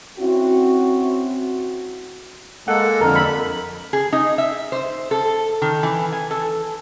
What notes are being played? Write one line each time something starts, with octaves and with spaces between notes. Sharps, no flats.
C4 C#4 E4 F#4
G#3 A#3 A4 F#5
F2 D3 A#4
A4 B5
G#4
D#4
E5
C5
A4
D#3
E3
G#5
A4